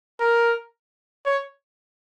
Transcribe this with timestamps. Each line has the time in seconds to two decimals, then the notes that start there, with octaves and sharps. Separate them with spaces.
0.20 A#4
1.26 C#5